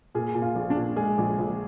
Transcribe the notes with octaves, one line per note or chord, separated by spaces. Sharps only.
A#2 G#4
A#2
F4
A#1
D4
A#2
G#3 G#4
A#1
A#1